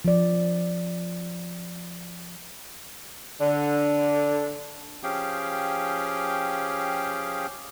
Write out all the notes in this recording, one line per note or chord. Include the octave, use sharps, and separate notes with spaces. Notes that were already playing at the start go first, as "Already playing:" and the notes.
F3 D5
D3
F3 C#4 G4 G#4 F5 G5